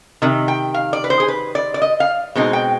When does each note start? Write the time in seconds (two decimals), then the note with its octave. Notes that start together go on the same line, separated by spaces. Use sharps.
0.22 C3 D#3
0.48 G5
0.74 F5
0.93 D5
1.04 B4
1.10 C5
1.20 G#4
1.28 B4
1.55 D5
1.74 D5
1.82 D#5
2.00 F5
2.35 B2 G#3 C4 D#4
2.53 G5